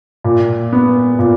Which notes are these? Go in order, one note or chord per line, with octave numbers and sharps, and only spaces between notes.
A#2
B3
A#2